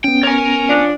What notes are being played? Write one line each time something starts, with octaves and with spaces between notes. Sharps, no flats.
B3 C#4 G5
A#4 C#5 G#5
F3 D4